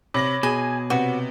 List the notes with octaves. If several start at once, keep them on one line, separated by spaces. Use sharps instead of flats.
C3 C#5 B5 D6 A#6 F#7
B2 G#4 G#5
C3 B3 F#4